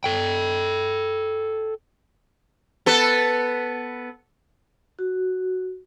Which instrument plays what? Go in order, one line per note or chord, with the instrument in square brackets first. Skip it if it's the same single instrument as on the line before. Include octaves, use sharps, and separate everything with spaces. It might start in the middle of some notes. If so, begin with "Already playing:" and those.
[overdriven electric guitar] A4 G5
[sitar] B3 A4 B4
[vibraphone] F#4